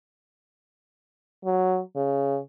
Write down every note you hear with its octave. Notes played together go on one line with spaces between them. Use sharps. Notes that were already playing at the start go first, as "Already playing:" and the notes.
F#3
C#3